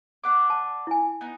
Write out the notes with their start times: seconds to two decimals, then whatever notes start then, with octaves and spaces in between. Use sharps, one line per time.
0.24 D4 F#5 D6
0.50 A5
0.87 E4 G#5
1.21 B3 D#4